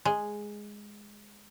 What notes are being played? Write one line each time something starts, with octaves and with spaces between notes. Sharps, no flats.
G#3